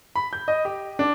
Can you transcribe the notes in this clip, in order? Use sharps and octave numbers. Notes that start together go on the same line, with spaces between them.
B5
G6
D#5
G4
D4